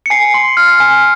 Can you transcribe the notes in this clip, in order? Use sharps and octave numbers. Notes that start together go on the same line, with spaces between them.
C#7
G#5 C7
C6
F6
G#5